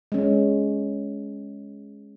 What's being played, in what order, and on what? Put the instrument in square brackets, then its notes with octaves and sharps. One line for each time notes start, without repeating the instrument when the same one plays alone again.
[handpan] G#3 C#4